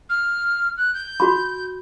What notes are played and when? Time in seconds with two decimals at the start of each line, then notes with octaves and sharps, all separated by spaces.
0.09 F6
0.77 F#6
0.94 G6
1.20 F#4 B5